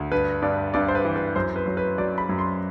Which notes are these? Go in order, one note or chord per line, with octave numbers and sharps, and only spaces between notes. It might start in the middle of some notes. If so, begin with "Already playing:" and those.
Already playing: D2
G2 B4
G2 D5
G2 D5
C5
B4
E3
B4
F#2 C5
B4
F#3
B4
F#3 D5
B5
F#2
C6